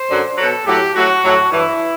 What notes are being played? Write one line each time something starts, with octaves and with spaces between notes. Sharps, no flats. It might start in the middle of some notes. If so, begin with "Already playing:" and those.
Already playing: C5
F#2 D3 F#3
B2 F#3 A4
A2 F#3 G4
A2 F#3 F#4
A2 F#3
G2 E3 E4